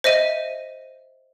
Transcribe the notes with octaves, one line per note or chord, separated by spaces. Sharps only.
C5 D#5 E5 D#7